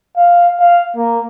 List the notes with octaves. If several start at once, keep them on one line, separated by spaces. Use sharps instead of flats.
F5
F5
A#3